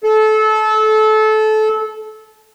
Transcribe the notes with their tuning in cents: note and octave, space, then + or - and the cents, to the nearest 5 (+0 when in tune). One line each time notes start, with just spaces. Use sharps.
A4 -25